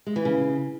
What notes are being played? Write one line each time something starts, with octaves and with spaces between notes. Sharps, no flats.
G#3
E3
C#3